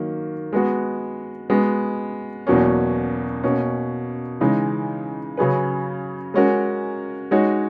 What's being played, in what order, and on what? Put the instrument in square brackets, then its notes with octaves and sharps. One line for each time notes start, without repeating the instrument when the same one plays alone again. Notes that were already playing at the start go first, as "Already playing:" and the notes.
Already playing: [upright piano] D#3 F#3 A#3
G#3 B3 F#4
G#3 B3 F#4
E2 B2 F#3 A#3 C#4
B2 A#3 C#4
C#3 E3 G#3 D#4
C#3 F#3 C#4 G#4 B4
G#3 C#4 F#4 A#4
G#3 D#4 F#4 C#5